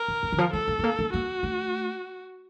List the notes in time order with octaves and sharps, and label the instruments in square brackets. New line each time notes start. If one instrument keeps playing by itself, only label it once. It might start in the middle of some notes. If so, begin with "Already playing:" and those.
Already playing: [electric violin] A#4
[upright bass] F#2
A2
D#3
F3
[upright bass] A3 [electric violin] A4
[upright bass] A#3
A3
A#3
A3
[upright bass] A#3 [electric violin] F#4
[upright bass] A3